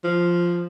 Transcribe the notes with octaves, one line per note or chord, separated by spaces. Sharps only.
F3